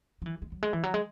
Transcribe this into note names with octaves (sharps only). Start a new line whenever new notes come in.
F#3
E3
G#3
F#3
G#3
E3
F#3
G#3